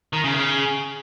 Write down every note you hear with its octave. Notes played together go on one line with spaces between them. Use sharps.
D#3
C#3
C#3